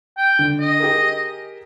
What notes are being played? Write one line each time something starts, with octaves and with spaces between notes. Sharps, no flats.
G5
D3
D#5
G4 G#4 A#4